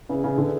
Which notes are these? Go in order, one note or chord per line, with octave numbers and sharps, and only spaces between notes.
E2 C#3
C#3
D3